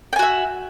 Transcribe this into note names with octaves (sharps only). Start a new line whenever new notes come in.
F#4 E5 G5 G#5